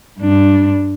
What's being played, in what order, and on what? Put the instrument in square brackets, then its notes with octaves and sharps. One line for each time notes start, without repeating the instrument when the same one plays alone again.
[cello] G2 D4